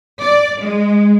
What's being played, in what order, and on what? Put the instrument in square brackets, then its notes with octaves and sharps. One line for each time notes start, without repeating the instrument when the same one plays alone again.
[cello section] D5
G#3